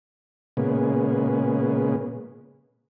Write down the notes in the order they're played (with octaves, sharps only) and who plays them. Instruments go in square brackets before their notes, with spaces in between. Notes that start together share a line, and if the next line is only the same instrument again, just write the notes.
[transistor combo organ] A#2 C#3 G#3 B3